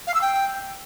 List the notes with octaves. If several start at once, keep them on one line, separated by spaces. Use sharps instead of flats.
F5
E6
G5